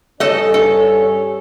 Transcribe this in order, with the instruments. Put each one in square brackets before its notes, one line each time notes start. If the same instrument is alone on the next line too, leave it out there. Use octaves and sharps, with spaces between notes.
[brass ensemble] G2 C#4 C#5 [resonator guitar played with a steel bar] A4 D#5
[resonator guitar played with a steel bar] A4